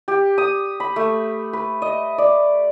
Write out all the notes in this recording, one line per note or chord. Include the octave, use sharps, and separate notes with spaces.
G4
D#6
B5
A3
B4
D#5
D5